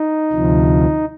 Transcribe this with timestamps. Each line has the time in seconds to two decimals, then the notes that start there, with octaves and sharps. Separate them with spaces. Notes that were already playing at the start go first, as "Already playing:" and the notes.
Already playing: D#4
0.32 D2 C3 F3